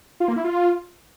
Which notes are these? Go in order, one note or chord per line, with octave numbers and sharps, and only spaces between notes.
F4
A#3
E4
F4